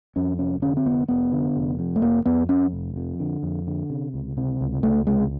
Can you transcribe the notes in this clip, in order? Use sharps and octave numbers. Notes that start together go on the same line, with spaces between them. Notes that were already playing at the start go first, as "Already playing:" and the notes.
F2 C#4
F1 C#4
D3 C#4
C4
F1 B3
F1 B3
D3
F1
F2
A3
F1 A#3
F2 B3
F2 C#4
F1
F2
D3
F2
D3
C3
C#2
C3
C#2
C#2 A3
C3 G#3